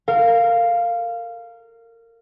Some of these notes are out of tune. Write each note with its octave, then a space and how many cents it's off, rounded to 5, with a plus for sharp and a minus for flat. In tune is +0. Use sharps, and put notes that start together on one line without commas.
A#4 -25 F5 +0